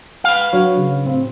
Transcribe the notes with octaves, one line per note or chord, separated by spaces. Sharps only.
B4 F5
F#3 D4 F#4 C#5
C#3
A2 C4